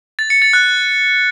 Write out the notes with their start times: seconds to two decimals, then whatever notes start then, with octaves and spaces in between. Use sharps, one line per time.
0.19 A6
0.30 C#7
0.42 A6
0.53 F#6